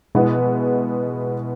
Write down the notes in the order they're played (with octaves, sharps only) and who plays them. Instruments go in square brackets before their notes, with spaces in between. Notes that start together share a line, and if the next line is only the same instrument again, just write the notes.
[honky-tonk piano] B2 G#3 B3 E4